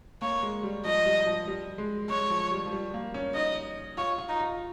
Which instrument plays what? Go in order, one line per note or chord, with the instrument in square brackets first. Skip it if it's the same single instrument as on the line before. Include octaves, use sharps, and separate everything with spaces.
[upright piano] A#3 [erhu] C#5
[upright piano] G#3
G3
[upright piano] F3 [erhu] D#5
[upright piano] G3
F3
G3
G#3
[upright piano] G#3 [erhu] C#5
[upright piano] F3
G3
F3
G3
A#3
C#4
[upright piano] D#4 [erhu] D#5
[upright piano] F4 [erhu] C#5
[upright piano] F4
[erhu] D#4
[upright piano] F4